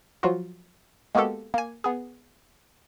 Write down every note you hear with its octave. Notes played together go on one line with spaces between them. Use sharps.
F3 F#3 F4 F#4
G#3 A#3 B3 F#4 G4 A4
A#3 G#5
B3 G#4